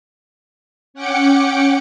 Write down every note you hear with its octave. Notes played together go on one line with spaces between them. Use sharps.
C#4 F#5 G5 D6 C#7